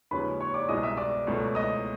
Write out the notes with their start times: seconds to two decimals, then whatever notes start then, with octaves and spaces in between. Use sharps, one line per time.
0.11 D#2 C#3 F3 G#3 C#4 B4 B5
0.40 C#5 C#6
0.54 D5 D6
0.68 C2 B2 G#3 D#5 D#6
0.83 E5 E6
0.97 D5 D6
1.27 C#2 B2 F#3 A3
1.55 D#5 D#6